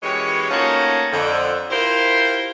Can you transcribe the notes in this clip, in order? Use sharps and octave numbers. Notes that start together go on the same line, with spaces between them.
F#2 E3 G#3 G4 C#5
A3 A#3 C#4 D#4 F4 F#4
F2 D3
E4 F4 G4 A#4 C5